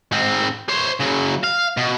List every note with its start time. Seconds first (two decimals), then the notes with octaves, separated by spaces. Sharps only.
0.12 G#2 C4
0.69 C5 C#5
1.01 C#3 F#3
1.44 F5
1.77 B2